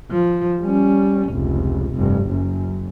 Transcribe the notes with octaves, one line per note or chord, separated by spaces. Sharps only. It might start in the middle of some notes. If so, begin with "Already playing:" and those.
F3
G3 C#4
F1 C#2
F1 G2
F#1 F#2